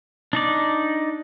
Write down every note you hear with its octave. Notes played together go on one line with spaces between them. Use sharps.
D4 D#4 D5